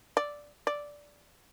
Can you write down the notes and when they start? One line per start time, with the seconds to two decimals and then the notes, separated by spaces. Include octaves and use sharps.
0.17 D5
0.67 D5